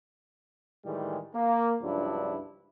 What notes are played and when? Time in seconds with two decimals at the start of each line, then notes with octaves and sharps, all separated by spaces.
0.85 A2 D#3 E3 G3 G#3
1.34 A#3
1.82 C#2 G2 F3 F#3 D4 E4